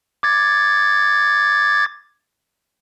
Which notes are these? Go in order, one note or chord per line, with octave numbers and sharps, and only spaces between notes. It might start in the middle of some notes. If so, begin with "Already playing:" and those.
D6 G#6 A6